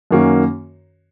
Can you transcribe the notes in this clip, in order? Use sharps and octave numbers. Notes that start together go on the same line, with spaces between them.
F#2 D#3 A#3 C#4 F#4